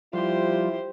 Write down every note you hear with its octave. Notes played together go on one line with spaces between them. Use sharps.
F3 G3 E4 F4 G4 C5